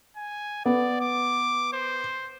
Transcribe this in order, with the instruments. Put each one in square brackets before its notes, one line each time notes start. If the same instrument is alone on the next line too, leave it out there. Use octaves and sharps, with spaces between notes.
[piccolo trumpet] G#5
[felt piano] B3 [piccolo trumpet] D5
[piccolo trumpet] D6
C5